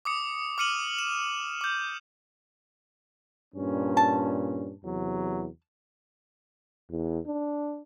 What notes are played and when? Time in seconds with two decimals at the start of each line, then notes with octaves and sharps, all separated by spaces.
0.05 D6 D#6 C#7
0.58 D6 F6 C#7 D#7 F#7
0.99 E7
1.61 D6 G6
3.55 G2 A#2 C#4
3.97 A5
4.84 E2 C3 F#3
6.90 E2
7.27 D4